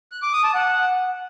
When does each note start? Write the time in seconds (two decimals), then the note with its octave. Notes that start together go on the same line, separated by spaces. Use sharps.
0.12 F#6
0.22 D6
0.33 D#6
0.44 A5
0.54 F#5